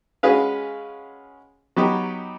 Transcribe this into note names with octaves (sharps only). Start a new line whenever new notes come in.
G#3 C#4 F#4 G#4 B4 F5
F#3 B3 D#4 G4